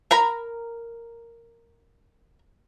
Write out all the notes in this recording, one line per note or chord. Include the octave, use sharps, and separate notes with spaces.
A#4 A#5 B5